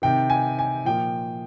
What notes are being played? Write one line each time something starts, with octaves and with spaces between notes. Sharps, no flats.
C3 D#3 G5
G#5
G#5
A#2 F3 G5